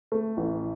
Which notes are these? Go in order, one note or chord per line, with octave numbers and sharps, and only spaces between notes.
A3
A1